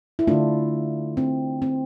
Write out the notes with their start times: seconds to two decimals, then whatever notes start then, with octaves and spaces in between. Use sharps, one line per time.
0.19 E4
0.27 D3 A3 D4 F4
1.17 C4
1.62 C4